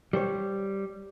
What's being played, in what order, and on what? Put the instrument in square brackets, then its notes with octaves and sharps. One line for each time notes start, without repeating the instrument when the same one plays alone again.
[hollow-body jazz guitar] G3 C5 C#5